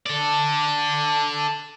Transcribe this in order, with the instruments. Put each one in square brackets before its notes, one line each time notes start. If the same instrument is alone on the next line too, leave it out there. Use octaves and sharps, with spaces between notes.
[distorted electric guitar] A4 D5